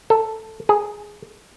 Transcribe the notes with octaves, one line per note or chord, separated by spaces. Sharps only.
A4
G#4